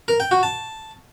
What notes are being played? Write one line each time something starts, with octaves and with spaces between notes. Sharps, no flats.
A#4
G5
F#4
A5